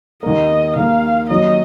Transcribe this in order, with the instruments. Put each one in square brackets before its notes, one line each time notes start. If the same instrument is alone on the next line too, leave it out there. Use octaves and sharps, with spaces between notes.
[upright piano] D#2 D#3 A#3 [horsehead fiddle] D#5
[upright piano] D#2 D#3 A#3 [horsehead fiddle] F5
[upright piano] D#2 D#3 F#3 C#4 F#4 [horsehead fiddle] D#5